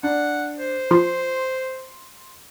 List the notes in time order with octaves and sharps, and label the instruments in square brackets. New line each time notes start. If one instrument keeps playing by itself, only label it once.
[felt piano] D4 [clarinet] F#5
[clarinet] C5
[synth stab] F3 [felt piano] C6